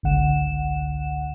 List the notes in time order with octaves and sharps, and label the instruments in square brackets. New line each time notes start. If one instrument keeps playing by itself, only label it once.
[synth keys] G#1 C#2 D3 F#5 E7